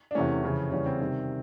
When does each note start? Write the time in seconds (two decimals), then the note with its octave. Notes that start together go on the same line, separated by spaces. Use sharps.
0.11 D4
0.15 E2 C3 E3 A3 C#4
0.43 F2 C#3 E3
0.72 E2 C#3 E3 G3 C#4
0.86 C4
1.01 C3 D#3 G3